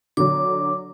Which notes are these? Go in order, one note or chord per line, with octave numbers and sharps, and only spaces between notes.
D3 F#3 D6